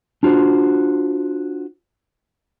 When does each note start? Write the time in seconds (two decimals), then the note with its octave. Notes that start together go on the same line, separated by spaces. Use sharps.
0.23 D4 F4 F#4 C5